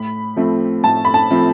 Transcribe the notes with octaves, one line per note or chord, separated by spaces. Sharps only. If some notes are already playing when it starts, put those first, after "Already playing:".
Already playing: A2 B5
F3 A3 C4
A2 A5
B5
A5
F3 A3 C4